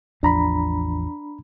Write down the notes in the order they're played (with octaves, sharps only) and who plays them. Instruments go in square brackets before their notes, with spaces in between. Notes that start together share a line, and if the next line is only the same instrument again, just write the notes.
[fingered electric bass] A1 E2 F3 [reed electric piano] D4 A#5 B5